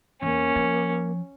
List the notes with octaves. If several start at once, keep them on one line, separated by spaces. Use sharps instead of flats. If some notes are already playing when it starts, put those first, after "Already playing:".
E2 A#3 C#4
F3